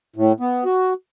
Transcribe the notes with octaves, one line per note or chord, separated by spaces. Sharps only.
A2
B3
F#4